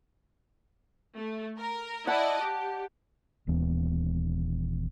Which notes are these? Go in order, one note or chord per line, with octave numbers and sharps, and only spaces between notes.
A3
A#4
E4 D5 D#5 F#5 A5
G4
D#1 D#2 E3 B3